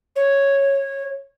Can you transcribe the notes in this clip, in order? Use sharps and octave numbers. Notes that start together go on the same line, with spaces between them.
C#5